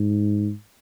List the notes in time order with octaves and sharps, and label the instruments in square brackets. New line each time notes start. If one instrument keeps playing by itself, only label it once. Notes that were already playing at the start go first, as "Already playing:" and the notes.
Already playing: [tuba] G#2